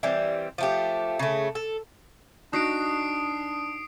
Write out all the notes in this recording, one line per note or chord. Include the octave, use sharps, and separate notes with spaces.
E3 G3 C4
F3 A3 G4
C#3 A3
A4
D4 D#4 F#4 D#6 C7 D7